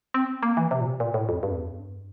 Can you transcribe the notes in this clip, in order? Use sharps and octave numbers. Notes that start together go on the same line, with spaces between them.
C4
A#3
E3
C3
A#2
C3
A#2
A2
F2
G2
F2
E2
F2
G2